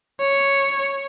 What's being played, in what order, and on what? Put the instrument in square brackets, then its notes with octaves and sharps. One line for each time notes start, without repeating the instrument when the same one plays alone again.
[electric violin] C#5